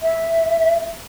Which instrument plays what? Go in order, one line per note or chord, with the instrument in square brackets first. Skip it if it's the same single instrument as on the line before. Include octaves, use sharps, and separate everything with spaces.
[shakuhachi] E5